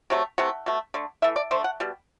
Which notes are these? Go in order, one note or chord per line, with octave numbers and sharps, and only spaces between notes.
C3 F#3 A3
C3 E3 A3 F#5
B2 A3
D3 A3
E3 A3 E5
D5
D3 A3 C5
F#5
B2 G3